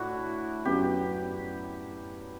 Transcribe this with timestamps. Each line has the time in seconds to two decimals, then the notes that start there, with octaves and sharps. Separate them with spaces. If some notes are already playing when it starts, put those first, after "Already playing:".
Already playing: A2 D4 E4 F#4
0.65 F#2 F#3 B3 G4